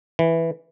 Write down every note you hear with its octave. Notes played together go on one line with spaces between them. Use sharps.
E3